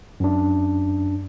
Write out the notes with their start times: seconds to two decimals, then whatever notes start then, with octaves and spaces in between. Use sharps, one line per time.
0.20 F#2 D4